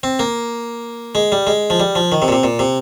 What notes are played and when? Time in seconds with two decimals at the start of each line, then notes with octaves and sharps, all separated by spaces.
0.03 C4
0.19 A#3
1.15 G#3
1.32 G3
1.47 G#3
1.70 F3
1.80 G3
1.95 F3
2.12 D#3
2.22 C3
2.28 A#2
2.32 C3
2.43 A#2
2.59 C3